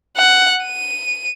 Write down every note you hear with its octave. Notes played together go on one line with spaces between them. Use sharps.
F#5
D#7